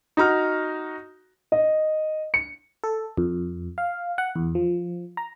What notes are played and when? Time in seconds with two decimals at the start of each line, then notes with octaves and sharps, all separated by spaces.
0.17 D#4 F#4 A#5 F6
1.52 D#5
2.34 C#7
2.84 A4
3.17 F2
3.78 F5
4.18 F#5
4.36 E2
4.55 F3
5.17 A#5